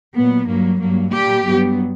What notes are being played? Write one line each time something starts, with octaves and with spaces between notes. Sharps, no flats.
A#2 F#3 B3
G2 F#3 A#3
G2 F#3 A#3
A#2 G3 A#3 G4
G2 F#3 B3